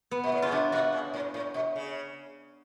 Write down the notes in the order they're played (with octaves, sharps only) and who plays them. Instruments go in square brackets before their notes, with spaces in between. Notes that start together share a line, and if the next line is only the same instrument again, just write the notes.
[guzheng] B3
[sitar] B2
A2
[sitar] C#3 [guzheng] F4
[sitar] B2 [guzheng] D4
[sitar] B2 [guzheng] F#4
[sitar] C#3
A2
A2
B2
C#3